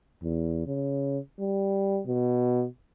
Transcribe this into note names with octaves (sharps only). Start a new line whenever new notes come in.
E2
C#3
G3
B2